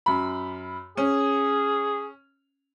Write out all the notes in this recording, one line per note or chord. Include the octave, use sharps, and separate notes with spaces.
F#2 B5
C#4 G#4